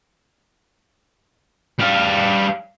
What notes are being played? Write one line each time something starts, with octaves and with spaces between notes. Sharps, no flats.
G3 F5